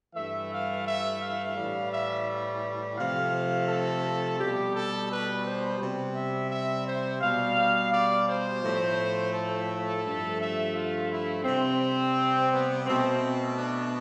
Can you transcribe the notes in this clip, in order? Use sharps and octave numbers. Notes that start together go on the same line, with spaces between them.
G2 E3 A3 E5
F5
E5
F5
A2 E3 G3
E5
C3 F3 A3 F5
A4
B2 G3 G4
A4
B4
C5
C3 G3
E5
E5
C5
B2 G3 F5
D5
C5
A2 F3 A3
A4
G2 F3 A3
E5
F4
E4
C3 G3 C4
B3
B2 A3 C4
C4
D4